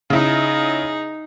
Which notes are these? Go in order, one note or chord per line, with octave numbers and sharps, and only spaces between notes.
C#3 D#4 E4 G#4